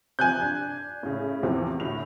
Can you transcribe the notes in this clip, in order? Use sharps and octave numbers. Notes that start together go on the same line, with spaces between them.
C3 F3 G#5 F#6 G6
D4
A2 C#3
E2 C3 F3
D2 A2 F7